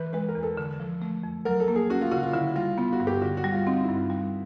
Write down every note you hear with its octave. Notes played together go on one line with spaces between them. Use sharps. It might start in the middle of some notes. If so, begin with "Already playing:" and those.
Already playing: E3 B4
G#3 B4
A#4
E2
A4
D3
F3
A3
F2
F#3 A#4
A4
A#3
G#4
C#4 F#4
F4
C#3 F#4
F4
D3 E4
G3 F4
B3 F4
F#4
G2
G4
D3 F#4
F#4
G3
F4
C4 D#4
G2 E4
F4
G3